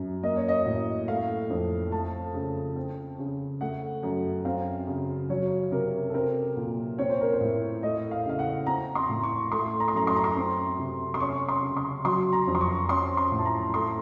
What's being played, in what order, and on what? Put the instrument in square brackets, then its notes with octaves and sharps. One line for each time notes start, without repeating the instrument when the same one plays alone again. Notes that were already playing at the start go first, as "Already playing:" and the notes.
Already playing: [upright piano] F#2
A#3 D#5
C#5
D#5
A2
A3 F5
F2
A3 A5
C#3
C4
C#3
A3 F#5
F#2
C4 F5
C#3
F#3 C#5
C3 A#4
A4
C4 A#4
A#2
C4 C#5
C5
A#4
C5
A2
A3 D#5
F5
C#3 F5
F#5
C4 A#5
C6
A2
C#6
A3 C6
A#5
C6
F#2 A#5
C6
A#5
C6
C4
C3
C6
C#4 C#6
C6
C#3
C6
F#3 C6
A#5
F2
C6
C#6
C#4 C6
C6
A2
A5
A#5
A3 C6